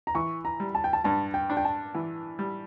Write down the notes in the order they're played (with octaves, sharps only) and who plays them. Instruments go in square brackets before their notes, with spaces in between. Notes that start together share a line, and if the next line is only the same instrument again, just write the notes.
[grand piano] A#5
[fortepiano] E3 [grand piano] C#6
[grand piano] A#5
[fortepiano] G3
[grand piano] A5
G5
A5
[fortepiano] G2 [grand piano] A5
[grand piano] G5
[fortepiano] D4
[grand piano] G5
A5
[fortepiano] E3
G3